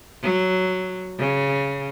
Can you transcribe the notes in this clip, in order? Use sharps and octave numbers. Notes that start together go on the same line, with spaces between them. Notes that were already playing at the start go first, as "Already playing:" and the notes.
F#3
C#3